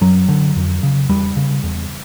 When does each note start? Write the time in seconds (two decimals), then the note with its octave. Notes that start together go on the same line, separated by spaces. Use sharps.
0.01 F#2 F#3
0.28 D3
0.56 F2
0.83 C#3
1.09 E2 G3
1.36 C#3
1.63 E2